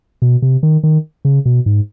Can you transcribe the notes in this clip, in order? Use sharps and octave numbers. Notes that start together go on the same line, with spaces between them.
B2
C3
D#3
D#3
C#3
B2
G#2